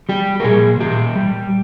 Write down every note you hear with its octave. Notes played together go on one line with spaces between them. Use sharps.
G3 G4
A#4
A#2 G#4
A#2 G4
G3